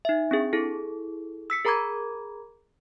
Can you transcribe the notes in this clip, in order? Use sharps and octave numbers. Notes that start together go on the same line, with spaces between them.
D#4 E5
C4 D4 G#4
E4 G#4 A4
E6 B6 C#7
G#4 A#4 A#5 B5 D6 G#6